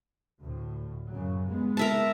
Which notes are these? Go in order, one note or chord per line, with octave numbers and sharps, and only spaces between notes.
D2 A2
F#2 C#3 F#3
G2 G#3 B3
A#4 E5 A5